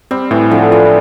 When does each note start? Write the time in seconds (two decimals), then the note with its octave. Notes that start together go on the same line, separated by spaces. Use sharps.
0.11 G3 C4
0.31 A2 E3
0.51 D3 F3
0.71 E3 F4